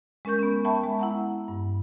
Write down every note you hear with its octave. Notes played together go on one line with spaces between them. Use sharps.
G#3 C#4 A#4 C#6 G6
B3 C#4
E5 G5 A5 B5 C#6
G#3
E4 F#5 A#5
G2